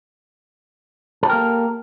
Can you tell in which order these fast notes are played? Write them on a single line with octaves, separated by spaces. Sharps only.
A4 G4 A#4 A#3